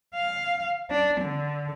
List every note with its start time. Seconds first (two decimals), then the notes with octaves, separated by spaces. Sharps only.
0.15 F5
0.90 D4
1.20 D3